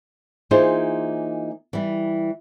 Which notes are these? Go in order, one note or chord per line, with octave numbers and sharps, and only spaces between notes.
E3 A#3 D#4 F4 G#4 C5
E3 G3